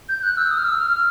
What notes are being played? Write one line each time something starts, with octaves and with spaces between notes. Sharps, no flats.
G6
F#6
E6
D#6
F6
E6
F6
F6